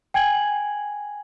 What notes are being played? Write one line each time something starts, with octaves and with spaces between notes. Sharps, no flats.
G5 G#5 G#6 F#7